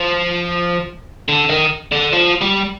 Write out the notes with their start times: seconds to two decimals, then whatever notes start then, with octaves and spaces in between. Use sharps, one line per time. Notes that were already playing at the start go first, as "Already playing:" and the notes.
Already playing: F3
1.28 D3
1.50 D#3
1.92 D3
2.13 F3
2.41 G3